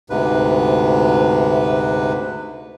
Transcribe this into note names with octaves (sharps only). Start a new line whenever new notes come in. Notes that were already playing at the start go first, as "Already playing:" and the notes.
D2 G#2 C3 B4